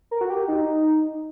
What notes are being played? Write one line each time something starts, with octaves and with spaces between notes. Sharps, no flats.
A#4
F#4
G4
D#4